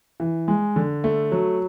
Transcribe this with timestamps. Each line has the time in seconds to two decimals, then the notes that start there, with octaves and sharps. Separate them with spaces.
0.20 E3
0.48 G#3
0.76 D3
1.04 A3
1.32 F#3